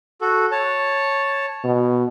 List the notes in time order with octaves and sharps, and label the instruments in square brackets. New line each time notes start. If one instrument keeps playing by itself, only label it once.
[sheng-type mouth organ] F#4 A4
C#5 A5
[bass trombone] B2